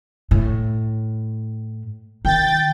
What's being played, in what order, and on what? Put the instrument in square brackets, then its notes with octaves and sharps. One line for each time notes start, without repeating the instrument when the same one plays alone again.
[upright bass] A2
[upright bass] D#3 [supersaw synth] G5 A6